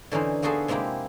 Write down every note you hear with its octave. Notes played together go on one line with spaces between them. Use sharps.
D3 E3 C#4 D#4 C5
A#3 B3 F#4 G#4 A4 C5
C3 G#3 A#3 E4 G4